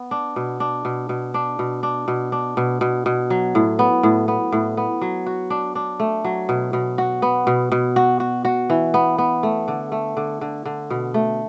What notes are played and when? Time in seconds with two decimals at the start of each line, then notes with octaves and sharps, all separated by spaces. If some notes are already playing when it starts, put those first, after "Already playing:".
Already playing: B3
0.11 D4
0.36 B2
0.60 D4
0.85 B2
1.09 B2
1.34 D4
1.59 B2
1.83 D4
2.08 B2
2.32 D4
2.57 B2
2.81 B2
3.06 B2
3.30 F#3
3.55 A2
3.79 B3
4.03 A2
4.28 B3
4.52 A2
4.77 B3
5.02 F#3
5.26 F#4
5.50 D4
5.75 D4
6.00 A3
6.25 F#3
6.49 B2
6.73 B2
6.98 F#4
7.22 B3
7.47 B2
7.72 B2
7.96 F#4
8.20 F#4
8.45 F#4
8.70 E3
8.94 B3
9.18 B3
9.43 A3
9.68 D3
9.92 A3
10.17 D3
10.41 D3
10.66 D3
10.90 B2
11.14 A3